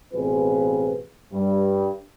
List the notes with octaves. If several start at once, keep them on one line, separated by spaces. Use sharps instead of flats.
A1 B2 C4 F4 G#4 B4
G2